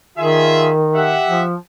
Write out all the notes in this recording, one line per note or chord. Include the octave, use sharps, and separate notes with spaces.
D#3 F4 G#4 E5
G4 E5 F#5
F3